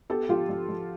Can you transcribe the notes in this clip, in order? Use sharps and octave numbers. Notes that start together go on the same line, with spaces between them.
B3 G4 A4
F3 F4 G4
F3
F3